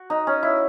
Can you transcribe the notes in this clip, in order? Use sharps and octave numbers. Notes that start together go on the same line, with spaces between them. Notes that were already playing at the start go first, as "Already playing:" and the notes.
Already playing: F#4
D#4
C#4
E4